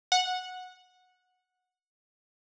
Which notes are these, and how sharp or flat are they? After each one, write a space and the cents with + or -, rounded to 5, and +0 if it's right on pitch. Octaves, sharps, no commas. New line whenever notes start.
F#5 -15